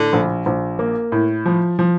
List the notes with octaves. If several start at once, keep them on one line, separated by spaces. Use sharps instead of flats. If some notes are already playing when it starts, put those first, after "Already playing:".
Already playing: A2 D3
A#1
A#1
A#3
A2
F3
F3